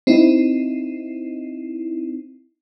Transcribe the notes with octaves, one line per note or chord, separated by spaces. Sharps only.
C4 D#4 E4